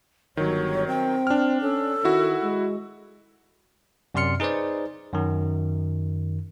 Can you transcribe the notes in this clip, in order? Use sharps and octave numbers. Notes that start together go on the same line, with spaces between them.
G1 D#3 F#3 C#5
C4 G5
D4 F6
C#4 A4
D#3 E4 F#4
G#3
F#2 C3 D5 C6 F6 C#7
D#4 G#4 B4 C5 D5
F#2 D#3